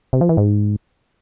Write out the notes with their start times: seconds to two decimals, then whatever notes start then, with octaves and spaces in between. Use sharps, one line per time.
0.13 C3
0.21 F3
0.29 E3
0.37 G#2